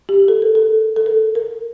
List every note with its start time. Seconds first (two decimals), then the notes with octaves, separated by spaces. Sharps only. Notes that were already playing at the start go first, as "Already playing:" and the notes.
0.09 G4
0.28 A4
0.42 A#4
0.55 A4
0.96 A4
1.06 A#4
1.35 A#4